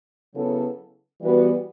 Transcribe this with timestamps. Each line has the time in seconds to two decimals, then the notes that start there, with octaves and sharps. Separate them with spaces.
0.34 C#3 F#3 B3 E4 A4
1.20 E3 G3 B3 F#4 B4